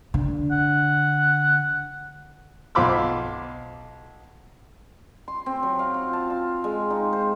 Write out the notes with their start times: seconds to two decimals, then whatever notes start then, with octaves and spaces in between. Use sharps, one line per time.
0.14 D3
0.51 F#5
2.75 B1 F4 C5 B5 D6 E6
5.28 C6
5.46 C4
5.63 F#3
5.79 F5
5.94 F4
6.13 A5
6.30 F5
6.64 G#3
6.90 D#4
7.13 C5